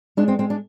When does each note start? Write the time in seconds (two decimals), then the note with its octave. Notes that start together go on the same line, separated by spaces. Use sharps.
0.17 G#3 D4
0.28 C4
0.39 G#3 C4
0.50 D4